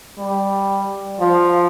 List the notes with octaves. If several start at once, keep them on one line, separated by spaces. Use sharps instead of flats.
G3
F3